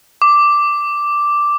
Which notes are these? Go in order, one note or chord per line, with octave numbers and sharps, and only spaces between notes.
D6